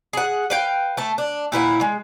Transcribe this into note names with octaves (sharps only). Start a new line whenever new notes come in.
G#4 F#5
B4 F5 G5
A3 A5
D4
A#2 E4 B4 F#5
G#3